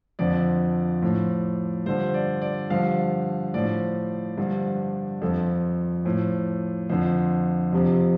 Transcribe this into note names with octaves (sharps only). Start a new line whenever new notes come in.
F2 D3 F3 D5
A2 F3
G2 D3 F3 C5
D5
D5
G2 D3 F3 F5
A2 F3 D5
G2 D3 F3
F2 F3 A4
A2 F3
F2 D3 F3 C5
F2 C3 F3